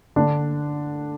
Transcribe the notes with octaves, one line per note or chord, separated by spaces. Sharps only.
D3 D4